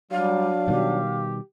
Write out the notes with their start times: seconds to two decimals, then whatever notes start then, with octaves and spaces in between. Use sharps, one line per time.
0.11 F#3 G3 D4 F5
0.68 B2 D#3 G3 G4